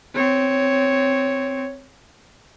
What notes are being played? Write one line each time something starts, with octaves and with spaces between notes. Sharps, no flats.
C4 C#5